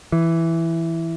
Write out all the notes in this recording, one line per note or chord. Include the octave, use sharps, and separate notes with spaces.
E3